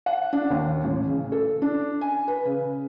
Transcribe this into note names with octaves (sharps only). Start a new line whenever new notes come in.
F#5
D4
D#2
A1
C#3
A4
D4
G#5
B4
C#3